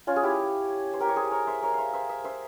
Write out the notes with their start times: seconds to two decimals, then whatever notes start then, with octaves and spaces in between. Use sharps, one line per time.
0.07 C#4 F4
0.16 G#4
0.23 E4 G4
0.93 C5
1.00 G4 A#4
1.08 C#5
1.16 G#4 C5
1.31 A#4 C#5
1.47 C5 E5
1.62 A#4 C#5
1.74 C5 E5 F5
1.93 C5 E5
2.09 C5 E5
2.24 C5 E5